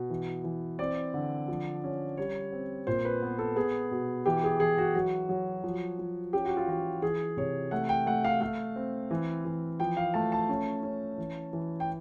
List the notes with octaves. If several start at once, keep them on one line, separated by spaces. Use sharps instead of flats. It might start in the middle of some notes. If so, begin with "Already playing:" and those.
Already playing: B2
E3
E3
C4 D5
D3
F3
C#4
G3 C#5
C4
A#2 C5
B4
B3
A4
B3 G#4
B2
E3 G4
G#4
E3 G#4
F#4
F#3 F#4
F#3
F3
F3
C#4 G4
F#4
F4
E3 F#4
E3 G#4
C3 C#5
A3 F#5
G5
A3 F#5
F5
A3 F5
C4
E3
E3
F3 G5
F5
A3 A5
A5
C#4
C#4
E3
E3
G5